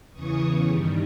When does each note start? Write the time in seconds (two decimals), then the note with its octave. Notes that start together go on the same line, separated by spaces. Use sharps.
0.13 E2 C#3 E3 C#6 D#6
0.66 G2 D#3 G3